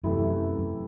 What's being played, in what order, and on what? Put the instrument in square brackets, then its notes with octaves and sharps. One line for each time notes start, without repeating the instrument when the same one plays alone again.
[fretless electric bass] F#2 [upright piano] C3 E3 A3 E4
[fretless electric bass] F#2
F#2